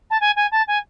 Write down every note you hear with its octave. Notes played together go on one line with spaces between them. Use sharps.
A5
G#5
G#5
A5
G#5